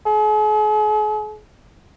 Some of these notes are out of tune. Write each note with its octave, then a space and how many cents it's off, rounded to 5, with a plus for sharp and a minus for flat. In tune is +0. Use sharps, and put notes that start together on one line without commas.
G#4 +45